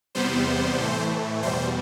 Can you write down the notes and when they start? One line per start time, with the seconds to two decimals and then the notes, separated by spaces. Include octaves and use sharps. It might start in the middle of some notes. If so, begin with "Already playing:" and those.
0.15 E2 C3 G3 B3 C5
0.79 A2 E3 A3
1.43 E2 B2 G3 C5